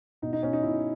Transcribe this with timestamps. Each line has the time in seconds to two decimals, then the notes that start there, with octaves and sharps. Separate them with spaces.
0.22 B2 D#4
0.33 D#4
0.43 B2 C#4
0.53 D#4
0.63 B2 E4